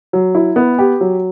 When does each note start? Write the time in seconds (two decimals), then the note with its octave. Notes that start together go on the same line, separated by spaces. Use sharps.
0.13 F#3
0.35 E4
0.56 B3
0.78 G4
1.01 F#3